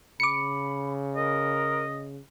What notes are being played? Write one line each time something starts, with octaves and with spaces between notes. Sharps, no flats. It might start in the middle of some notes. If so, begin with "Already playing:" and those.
C#3 B5 D6 C#7
A#4 D#5